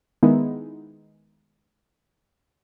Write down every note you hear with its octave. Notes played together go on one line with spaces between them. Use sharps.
D#3 G#3 B3 D#4 E4